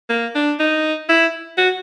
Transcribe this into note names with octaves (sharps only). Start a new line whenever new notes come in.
A#3
D4
D#4
E4
F#4